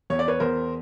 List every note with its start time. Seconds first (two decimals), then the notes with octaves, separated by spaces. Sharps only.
0.10 E2 C#5
0.19 D5
0.28 B4 C#5
0.40 E2 A#4 C5